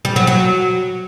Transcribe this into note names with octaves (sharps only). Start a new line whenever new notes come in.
G3
F#3
F#3